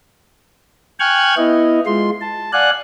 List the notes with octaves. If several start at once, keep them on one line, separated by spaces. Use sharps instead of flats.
G5 G#5 C#6 F6 F#6 G#6
B3 E4 D#5
G#3 F4 C6
A5
D5 F5 F#5 G#5 F#6